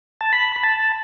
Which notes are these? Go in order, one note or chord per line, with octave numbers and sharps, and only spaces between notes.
A5
B5
B5
A5